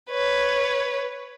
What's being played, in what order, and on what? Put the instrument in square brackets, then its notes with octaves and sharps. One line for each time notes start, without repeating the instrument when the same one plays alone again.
[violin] B4 C#5